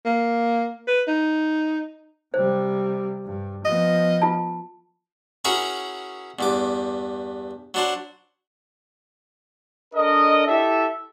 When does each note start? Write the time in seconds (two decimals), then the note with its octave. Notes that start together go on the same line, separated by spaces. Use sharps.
0.05 A#3
0.87 B4
1.08 D#4
2.34 C3 G3 C5
3.24 G2
3.65 F3 B3 D#5
4.22 F4 A5
5.45 C#4 E4 F#4 G#4 A#4 A#5
6.39 E2 G2 D6
7.74 F#3 D4 C5
9.94 D4 A4 A#4 D#5
10.47 E4 G4 A4 E5